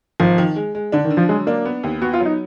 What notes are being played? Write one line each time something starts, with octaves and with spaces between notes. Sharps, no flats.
G#1 F3
D#3
G#3
G#3
D3 D4
D#3
D3
F3
F#3 G#3
A#3 D4
B3
D#2
B3 F#4
F4
F#3
D#4